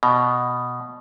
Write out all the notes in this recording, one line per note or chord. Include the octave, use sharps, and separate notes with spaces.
B2